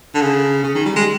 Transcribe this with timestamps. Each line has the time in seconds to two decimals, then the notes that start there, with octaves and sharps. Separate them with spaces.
0.14 D3
0.22 C#3
0.64 C#3
0.75 D#3
0.85 G3
0.96 G#3